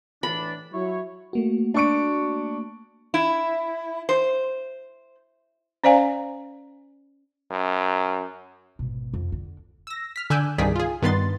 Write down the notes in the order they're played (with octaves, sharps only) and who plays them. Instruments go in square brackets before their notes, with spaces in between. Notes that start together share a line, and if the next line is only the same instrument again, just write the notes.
[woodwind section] A2 E3 D4 [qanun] B5
[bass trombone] F#3 [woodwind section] E4 C#5
[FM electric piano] A3 A#3 F#4
[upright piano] D4 C#6 D7
[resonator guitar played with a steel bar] E4
C5
[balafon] C#4 C5 D5 F5 G#5 A#5
[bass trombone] F#2
[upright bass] G#1 B2
F2
D3
[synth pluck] E6 A#6
F6 B6
D3 G#5 D6 E6 F#6 G6
C2 G2 D#3 G#4 D5 B6
F4 G#4
G2 D#3 B3 B4 C6 A6